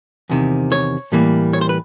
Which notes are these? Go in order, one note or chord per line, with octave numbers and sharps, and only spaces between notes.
E2 C3 D#3
C#5
A2 E3 G3 A#3
C#5
C5
B4